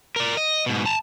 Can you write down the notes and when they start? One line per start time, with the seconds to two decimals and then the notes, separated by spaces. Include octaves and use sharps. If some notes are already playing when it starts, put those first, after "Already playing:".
0.16 A#4 D5
0.37 D#5
0.66 G#2 B2
0.86 A5 A#5